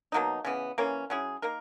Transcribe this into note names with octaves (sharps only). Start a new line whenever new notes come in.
B2 F#3 A#3 D#4
C#3 E3 B3
E3 A#3 C#4
F#3 C#4 E4 G#4
A#3 D#4 A#4